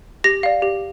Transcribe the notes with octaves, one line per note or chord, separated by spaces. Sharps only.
G4 A#6
D5 F5
G4